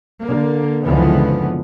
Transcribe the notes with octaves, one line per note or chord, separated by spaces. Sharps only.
D3 A#3
F#1 C#2 D3 E3 F3 B3